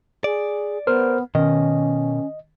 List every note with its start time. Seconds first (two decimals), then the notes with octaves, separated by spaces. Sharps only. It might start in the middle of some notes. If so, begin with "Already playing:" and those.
0.24 G#4 D5
0.87 B3 A#4 C5 F6
1.35 B2 D#3 C#4 D#5